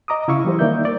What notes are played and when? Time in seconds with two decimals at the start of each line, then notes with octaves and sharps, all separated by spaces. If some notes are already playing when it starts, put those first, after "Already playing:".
0.08 D#5 A#5 D6 D#6
0.28 C#3 E4 E5 F5 C#6
0.45 E3 G3 C5
0.59 D#3 A#3 A#4 D5 E5 G6
0.85 D5